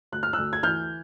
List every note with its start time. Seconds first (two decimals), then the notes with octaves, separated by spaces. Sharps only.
0.12 D2 F#6
0.23 F6
0.33 D2 E6 F#6
0.53 G#6
0.63 E3 F6 G6